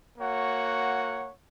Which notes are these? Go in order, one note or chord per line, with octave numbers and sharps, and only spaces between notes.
A#3 F#4 C#5 F#5